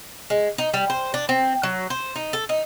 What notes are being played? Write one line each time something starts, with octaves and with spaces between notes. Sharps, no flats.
G#3
D#4
G3
C5
D4
C4
F#3
C5
D#4
A4
D#4